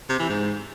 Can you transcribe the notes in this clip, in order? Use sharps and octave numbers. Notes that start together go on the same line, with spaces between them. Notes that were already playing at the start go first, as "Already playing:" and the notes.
C3
E3
G#2